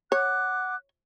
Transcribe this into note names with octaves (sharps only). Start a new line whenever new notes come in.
C#5 F#5 D6 F#6